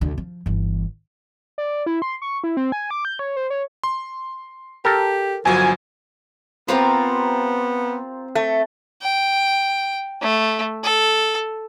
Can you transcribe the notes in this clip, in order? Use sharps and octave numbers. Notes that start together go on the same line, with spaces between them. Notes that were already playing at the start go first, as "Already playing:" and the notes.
D2 D3
F3
G1 E3
D5
E4
C6
C#6
E4
C4
G#5
D6
G6
C#5
C5
C#5
C6
G4 A4 A#4
G1 F3 F#3 G#5
B3 C4 F4 G4 A#4 C5
A3
G5
A3
A4